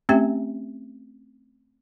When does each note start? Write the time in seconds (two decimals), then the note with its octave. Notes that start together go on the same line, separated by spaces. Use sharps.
0.09 A3 C4 C#4 G4 E5 G5